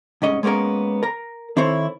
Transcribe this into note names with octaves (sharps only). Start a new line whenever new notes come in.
C2 G#2 C#4 D#5
G#3 A#3 B3 C#4 A#4
A#4 A#5
D#3 C4 E4 A4 C5 C#5